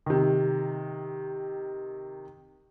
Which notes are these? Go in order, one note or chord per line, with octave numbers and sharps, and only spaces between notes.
C3 D#3